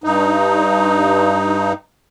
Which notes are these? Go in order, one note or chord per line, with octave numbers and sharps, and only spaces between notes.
G2 D#4